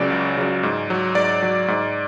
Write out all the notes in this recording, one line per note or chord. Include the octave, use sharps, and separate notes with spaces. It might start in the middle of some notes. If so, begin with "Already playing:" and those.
Already playing: C#2 C#3 F#3 D5
C#2
C#3 F#3
G#2
F#3
G#2 D5
F#3
G#2